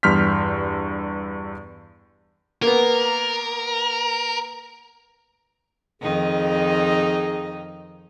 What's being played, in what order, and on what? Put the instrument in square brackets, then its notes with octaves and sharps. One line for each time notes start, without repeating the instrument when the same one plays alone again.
[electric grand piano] E2 G2 C6 F6 G6 B6
[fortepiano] A#3 B3 [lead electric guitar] A#4
[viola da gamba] F2 D#3 D#4 [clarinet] G#4